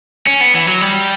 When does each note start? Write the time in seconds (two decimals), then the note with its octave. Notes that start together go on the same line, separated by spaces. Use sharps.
0.27 C#4
0.41 B3
0.54 E3
0.68 F#3
0.81 G3